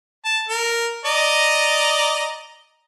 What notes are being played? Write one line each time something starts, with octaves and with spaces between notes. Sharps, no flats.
A5
A#4
D5 D#5 A#5